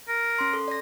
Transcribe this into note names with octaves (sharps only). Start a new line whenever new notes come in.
A#4
C#4 C6
A4
D5 A#6